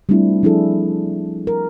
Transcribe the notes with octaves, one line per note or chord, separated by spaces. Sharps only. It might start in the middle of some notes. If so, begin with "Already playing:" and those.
G3 A3 C4 D4 E4 F4
F3 D4 E4 G#4 A4
A#4